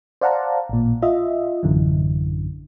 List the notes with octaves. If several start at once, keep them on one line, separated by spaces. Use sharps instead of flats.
C5 D5 F5 F#5 A5 A#5
A1 A#2
F4 D#5 E5
A1 F#2 D3 E3